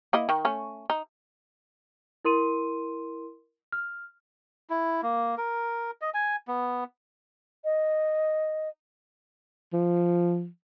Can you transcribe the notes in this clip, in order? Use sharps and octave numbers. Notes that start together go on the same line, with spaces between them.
A#3 E4 D#5
D#3
A3 C#4
D#4
E4 A#4 C6 D#7
F6
E4
A#3
A#4
D#5
G#5
B3
D#5
F3